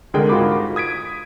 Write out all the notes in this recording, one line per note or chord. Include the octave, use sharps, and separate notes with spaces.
C2 D3 G#3 G#4 A#4 G5
G#2 F4 F#4 A#4 B5 D6
D#6 G#6 B6 D7